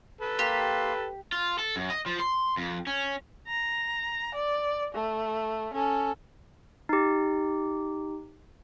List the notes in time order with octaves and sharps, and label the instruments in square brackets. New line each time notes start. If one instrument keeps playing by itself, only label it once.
[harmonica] A4 B4
[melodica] A#3 C6 [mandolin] G4
[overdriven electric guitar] F4
A4
F#2
D#5
F3
C6
F2
C#4
[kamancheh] A#5
D5
A3
C#4 A4
[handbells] D#4 G4